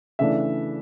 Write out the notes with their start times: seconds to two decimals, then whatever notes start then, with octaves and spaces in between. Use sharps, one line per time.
0.19 C#3 E3 A3 D4 E5